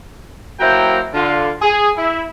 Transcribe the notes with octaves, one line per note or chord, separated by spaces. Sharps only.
F#3 A#3 E4 C5 G5 A#5
D3 F4
G#4
E4